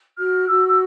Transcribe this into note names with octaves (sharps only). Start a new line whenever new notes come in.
F#4 F6
F#4 E6
E6